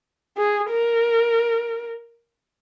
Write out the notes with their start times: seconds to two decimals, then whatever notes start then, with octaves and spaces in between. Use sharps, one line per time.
0.37 G#4
0.70 A#4